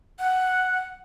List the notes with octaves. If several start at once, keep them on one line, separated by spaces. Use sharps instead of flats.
F#5